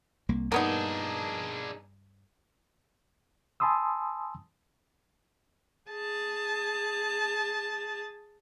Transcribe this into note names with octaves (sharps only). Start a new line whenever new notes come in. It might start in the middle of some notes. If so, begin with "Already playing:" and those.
C2 A#3
G2 A#3 B3 D4 D#4 G#4
G#5 A5 B5 C6 D#6 E6
G#4 A5